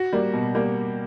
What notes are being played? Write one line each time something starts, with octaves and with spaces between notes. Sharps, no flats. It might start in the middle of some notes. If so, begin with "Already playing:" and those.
Already playing: F#4
G3 A#3
B2
G3 A#3